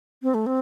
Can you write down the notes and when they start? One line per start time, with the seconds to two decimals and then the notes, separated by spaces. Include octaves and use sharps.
0.23 C4
0.34 A3
0.46 C4